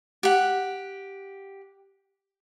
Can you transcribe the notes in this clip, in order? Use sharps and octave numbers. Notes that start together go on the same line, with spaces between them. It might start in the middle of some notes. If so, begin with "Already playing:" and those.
G4 F#5